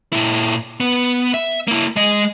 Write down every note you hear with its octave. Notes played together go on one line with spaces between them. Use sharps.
A#2 E4
B3
E5
A#3 E4
G#3 D#5